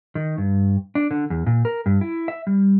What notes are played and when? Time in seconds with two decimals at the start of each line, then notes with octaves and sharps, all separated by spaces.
0.15 D#3
0.38 G2
0.95 D4
1.11 D3
1.30 E2
1.46 A#2
1.65 A#4
1.86 G2
2.01 E4
2.28 E5
2.47 G3